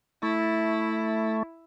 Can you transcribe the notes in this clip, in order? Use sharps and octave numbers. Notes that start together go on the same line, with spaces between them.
A3 E4